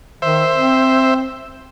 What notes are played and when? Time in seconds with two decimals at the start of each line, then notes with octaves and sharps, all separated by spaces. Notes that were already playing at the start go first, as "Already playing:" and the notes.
0.22 D#3 C5 E5
0.54 C4